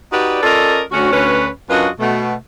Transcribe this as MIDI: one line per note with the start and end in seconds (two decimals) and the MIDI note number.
0.12 0.40 63
0.12 0.40 66
0.12 0.40 67
0.12 0.40 71
0.12 0.40 74
0.43 0.80 61
0.43 0.80 65
0.43 0.80 69
0.43 0.80 70
0.43 0.80 74
0.43 0.80 75
0.91 1.12 38
0.91 1.12 61
0.91 1.12 66
1.13 1.48 38
1.13 1.48 61
1.13 1.48 71
1.70 1.88 42
1.70 1.88 62
1.70 1.88 65
1.70 1.88 66
1.70 1.88 71
1.70 1.88 75
1.99 2.34 47
1.99 2.34 57